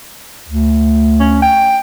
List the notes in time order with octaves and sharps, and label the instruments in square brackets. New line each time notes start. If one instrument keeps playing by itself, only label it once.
[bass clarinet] D2
[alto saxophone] C#4
G5